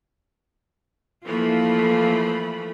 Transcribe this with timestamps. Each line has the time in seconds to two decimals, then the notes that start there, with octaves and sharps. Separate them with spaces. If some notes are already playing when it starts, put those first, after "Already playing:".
1.25 E3 F3 A3 A#3 B5